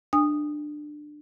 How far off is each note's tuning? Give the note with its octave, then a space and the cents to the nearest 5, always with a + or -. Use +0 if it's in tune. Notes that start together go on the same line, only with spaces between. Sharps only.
D4 +20 G#5 -45 D#6 -10